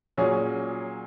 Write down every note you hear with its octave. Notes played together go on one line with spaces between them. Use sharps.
A#2 F#3 C#4 G#4